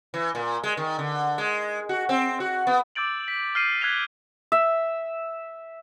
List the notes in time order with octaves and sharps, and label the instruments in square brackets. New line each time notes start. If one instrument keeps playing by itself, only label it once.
[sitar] E3
A#2
G#3
D#3
D3
G#3
F#4
C4
F#4
B3
[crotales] D6 E6 G6 A6 D7 F#7
B6
F6 G6 C7 D7 D#7
F#6 G#6 B6 D#7 F7 G7
[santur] E5